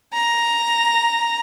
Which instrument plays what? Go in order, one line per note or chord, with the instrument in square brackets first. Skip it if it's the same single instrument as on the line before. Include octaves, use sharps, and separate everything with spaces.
[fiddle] A#5